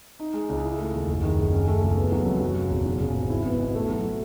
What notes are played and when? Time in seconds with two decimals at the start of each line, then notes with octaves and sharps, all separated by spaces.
0.20 D#4
0.34 G#3
0.49 C#2
0.63 E4
0.78 A3
0.94 D#2
1.08 F#1
1.23 D#3
1.38 F#1
1.52 C#4
1.67 A3
1.82 C#2
1.97 B3
2.12 F#3
2.26 F#2
2.40 F#3
2.56 C#3
2.70 E1
2.85 F#3
3.00 C#3
3.14 G#1
3.30 E4
3.45 B3
3.60 B2
3.75 A3
3.89 F#3